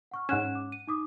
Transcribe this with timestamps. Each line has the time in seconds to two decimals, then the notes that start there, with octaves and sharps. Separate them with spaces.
0.11 F#5 C#6 F6
0.29 G#2 C#4 F#5 F#6 E7
0.55 D6
0.72 D#7
0.88 D#4 D6 D#6